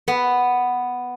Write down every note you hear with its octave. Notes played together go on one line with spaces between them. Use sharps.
B3